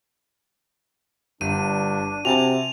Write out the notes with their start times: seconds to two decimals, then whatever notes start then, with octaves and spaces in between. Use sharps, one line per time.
1.41 G1 G2 D4 D#7
2.25 C3 F#4 G#5 A5 F7